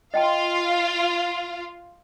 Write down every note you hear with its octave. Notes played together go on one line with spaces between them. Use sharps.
F4 D#5 F5 G5 A5